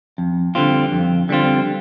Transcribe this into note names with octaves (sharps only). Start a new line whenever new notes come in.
F2
D3 G3 C4 F4
F2
D3 G3 C4 F4